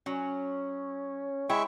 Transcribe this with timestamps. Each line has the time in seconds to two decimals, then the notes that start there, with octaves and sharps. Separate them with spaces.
0.06 F#3 C#4
1.49 G#3 E4 E5 G5 C#6